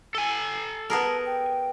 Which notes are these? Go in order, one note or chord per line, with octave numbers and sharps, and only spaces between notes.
A4 G#5
B3 G#4 A#4 A5
G5